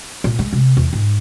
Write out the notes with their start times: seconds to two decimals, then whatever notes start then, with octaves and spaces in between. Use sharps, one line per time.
0.24 A#2
0.39 G#3
0.53 C3
0.77 E2
0.93 G#2